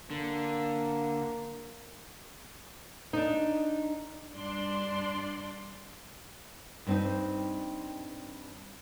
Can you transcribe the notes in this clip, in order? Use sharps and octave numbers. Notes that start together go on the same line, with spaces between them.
D3 A#3
D4 D#4
G2 D4 D5 C6
G2 C4 D#4